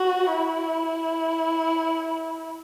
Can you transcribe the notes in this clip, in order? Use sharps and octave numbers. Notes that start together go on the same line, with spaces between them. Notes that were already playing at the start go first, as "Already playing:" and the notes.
Already playing: F#4
E4